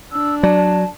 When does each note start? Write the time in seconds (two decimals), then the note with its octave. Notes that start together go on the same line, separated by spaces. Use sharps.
0.12 D4 E6
0.43 F#3 D5 A5